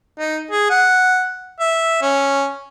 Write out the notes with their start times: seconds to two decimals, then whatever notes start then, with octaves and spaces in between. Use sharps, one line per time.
0.19 D#4
0.51 G#4
0.70 F#5
1.60 E5
2.02 C#4